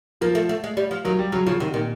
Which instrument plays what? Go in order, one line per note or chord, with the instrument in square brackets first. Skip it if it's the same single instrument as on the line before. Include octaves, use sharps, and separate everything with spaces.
[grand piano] F3 [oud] A#3
[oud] A3
A3
G#3
G3
F3
[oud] D#3 [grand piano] F#3
[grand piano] G3
[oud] C#3 [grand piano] F#3
[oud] C#3 [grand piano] F3
[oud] C3 [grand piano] D#3
[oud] A#2 [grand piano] D#3